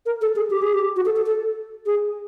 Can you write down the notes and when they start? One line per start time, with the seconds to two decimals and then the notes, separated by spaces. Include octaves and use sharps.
0.06 A#4
0.21 A4
0.36 G#4
0.50 G4
0.62 G#4
0.73 G4
0.96 F#4
1.05 A4
1.16 A4
1.26 A4
1.86 G#4